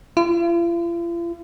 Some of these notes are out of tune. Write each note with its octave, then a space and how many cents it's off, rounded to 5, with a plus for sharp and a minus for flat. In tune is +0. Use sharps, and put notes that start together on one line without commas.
F4 -45